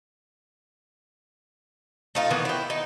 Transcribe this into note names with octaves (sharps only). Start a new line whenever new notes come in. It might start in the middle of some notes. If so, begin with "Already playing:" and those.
A3 D#4 F4
D#3 E3 B3
E4 G5
D#4